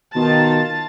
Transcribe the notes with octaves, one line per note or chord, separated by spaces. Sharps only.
B2 D#3 F4 A5